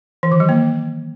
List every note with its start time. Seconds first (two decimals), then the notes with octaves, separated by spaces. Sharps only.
0.23 E3
0.32 D#3
0.40 F#3
0.49 A#3